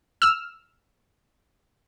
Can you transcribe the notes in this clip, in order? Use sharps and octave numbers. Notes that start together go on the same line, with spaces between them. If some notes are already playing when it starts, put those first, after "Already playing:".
E6 F6